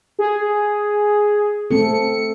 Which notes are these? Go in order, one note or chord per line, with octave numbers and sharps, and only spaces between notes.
G#4
A3 C4 A4 C#7